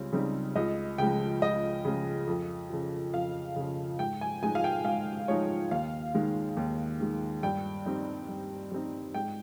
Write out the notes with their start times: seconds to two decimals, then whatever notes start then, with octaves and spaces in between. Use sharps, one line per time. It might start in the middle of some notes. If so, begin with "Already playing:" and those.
Already playing: C#2 C#3 G3 C4 C#5
0.12 C#3 G3 C4 D#4
0.56 C#2 D#5
0.98 C#3 F3 G#3 G5
1.42 C#2 D#5
1.85 C#3 F3 G#3
2.27 F2
2.70 C#3 F3
3.13 F2 F5
3.56 C#3 F3
3.99 G#2 G5
4.21 G#5
4.43 F3 G#3 D#4 G#5
4.55 F5
4.64 G5
4.85 G#2 F5
5.28 F3 G#3 D#4 C#5
5.71 D#2 F5
6.15 D#3 G#3
6.57 D#2
7.00 D#3 G#3
7.43 G2 G5
7.86 G3 C4 D#4
8.29 G2
8.71 G3 C4 D#4
9.14 G#2 G5